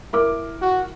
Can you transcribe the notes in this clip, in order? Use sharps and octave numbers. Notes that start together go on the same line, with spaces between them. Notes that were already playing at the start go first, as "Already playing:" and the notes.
E4 A#4 D6
F#4